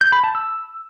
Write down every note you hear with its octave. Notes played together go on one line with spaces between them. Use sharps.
G6
B5
A5
E6